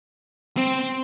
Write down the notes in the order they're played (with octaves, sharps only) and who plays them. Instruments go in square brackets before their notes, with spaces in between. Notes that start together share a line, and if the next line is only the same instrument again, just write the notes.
[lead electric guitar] C4